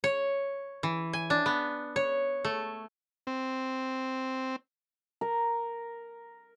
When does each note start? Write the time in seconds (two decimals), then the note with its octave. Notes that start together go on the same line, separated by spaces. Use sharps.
0.04 C#5
0.83 E3
1.13 G#5
1.30 D4
1.46 B3
1.96 C#5
2.44 A3
3.27 C4
5.21 A#4